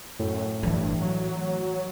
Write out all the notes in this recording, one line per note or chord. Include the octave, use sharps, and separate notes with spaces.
F#2 A2
G2 E3 A3
F#3